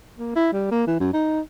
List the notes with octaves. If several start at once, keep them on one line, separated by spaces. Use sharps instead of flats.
A#3
E4
G3
A#3
E3
F#2
D#4